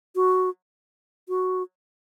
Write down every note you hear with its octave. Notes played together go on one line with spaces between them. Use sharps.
F#4
F#4